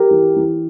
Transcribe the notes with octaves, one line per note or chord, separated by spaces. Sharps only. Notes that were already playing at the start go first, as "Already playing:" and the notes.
Already playing: G4 A#4
E3
E3